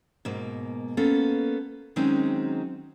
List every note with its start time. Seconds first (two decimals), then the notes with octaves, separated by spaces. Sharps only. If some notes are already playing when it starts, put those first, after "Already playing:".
0.25 G#2 B2 A#3
0.97 A#3 B3 C#4 A4
1.96 D#3 F#3 G#3 C4 C#4 D#4